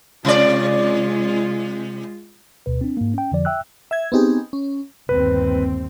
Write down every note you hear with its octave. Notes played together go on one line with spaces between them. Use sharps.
C3 G#3 F4 D5
D2 B2 B4
C4 D4
G#2 A#3
C#4 G5
F2 D3 F3 D5
E5 G5 E6 F#6
E5 G#6
B3 C4 D#4 G4 G#4
C#4
G1 D#2 C4 B4